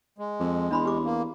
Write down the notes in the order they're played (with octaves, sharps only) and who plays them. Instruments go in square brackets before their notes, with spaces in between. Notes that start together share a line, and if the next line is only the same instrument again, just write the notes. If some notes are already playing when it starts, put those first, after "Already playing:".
[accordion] G#3
[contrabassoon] F2
[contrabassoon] E2 [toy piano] D4 B5 C6
[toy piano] G4 D6
[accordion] A#3